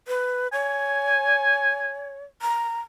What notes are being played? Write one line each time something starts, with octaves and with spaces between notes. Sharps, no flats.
B4
C#5 G#5
A#5